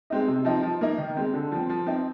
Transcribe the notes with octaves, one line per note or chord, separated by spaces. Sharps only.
G#3 C4 D#4
C3
F3 C4 D#4
F3
A#3 D#4
D#3
G#3 C4
D3
F3 C4
F3
C4 D#4